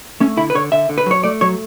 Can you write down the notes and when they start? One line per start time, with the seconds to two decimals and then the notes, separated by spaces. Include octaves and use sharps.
0.20 A3 C#4
0.37 D3 E4
0.50 B4
0.55 D3 C#5
0.72 D3 E5
0.89 D3
0.98 B4
1.06 F#3 C#5
1.23 A3 D5
1.41 F#3 C#5